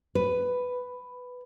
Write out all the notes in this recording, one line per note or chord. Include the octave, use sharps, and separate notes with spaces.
B4